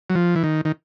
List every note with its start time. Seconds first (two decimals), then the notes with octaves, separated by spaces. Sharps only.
0.10 F#3
0.15 F3
0.36 E3
0.44 D#3
0.65 D#3